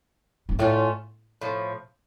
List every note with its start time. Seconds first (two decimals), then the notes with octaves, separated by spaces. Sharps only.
0.49 G#2
0.59 A2 A3 C#4 F4
1.41 A2 F3